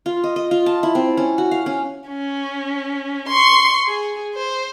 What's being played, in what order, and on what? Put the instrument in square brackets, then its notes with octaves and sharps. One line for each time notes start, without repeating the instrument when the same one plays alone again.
[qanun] F4
D#5
D#5
F4
A5
E4
C4
C#4
F#4
F5
C#4
[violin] C#4
C6 C#6
G#4
C5